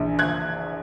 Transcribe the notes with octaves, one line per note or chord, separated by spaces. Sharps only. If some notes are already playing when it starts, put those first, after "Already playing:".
Already playing: A#1 E3
F#6 G#6